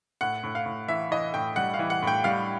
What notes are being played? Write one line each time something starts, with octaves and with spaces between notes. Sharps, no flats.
A2 F#5
A2
F5
A2
E3 E5
E3 D#5
A2 G5
G3 F#5
F5
E3
F#5
A2 G5
G3 F5